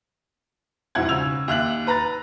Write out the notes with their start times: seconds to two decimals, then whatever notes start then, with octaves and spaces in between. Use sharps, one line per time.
0.95 E1 F2 G#2 E4 F#5 G#6
1.09 C#3 E6 G#6 F7
1.48 D#2 E5 F#6 F#7
1.87 B4 A#5 B5 A6